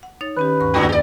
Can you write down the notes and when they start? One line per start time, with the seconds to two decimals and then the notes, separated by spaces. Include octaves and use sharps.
0.03 F#5
0.21 D#4 C#5 A6
0.37 D#3 C#4 G4 B4
0.60 D2 G2 C#6
0.74 E2 G#2 D3 A#3 F#4 E6
0.89 G4 D5